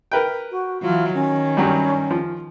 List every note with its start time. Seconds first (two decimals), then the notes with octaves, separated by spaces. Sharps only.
0.12 A#4 B4 G5
0.51 F#4
0.82 E3 F#3 F4
1.14 D#3 C#4
1.57 G2 F#3 G3
2.11 F3